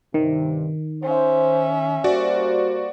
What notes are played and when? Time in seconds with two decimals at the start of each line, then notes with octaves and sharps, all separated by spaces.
0.14 G2 C3 D#3
1.03 C#4 C5 E5
2.04 G3 A#3 F#4 C5 D5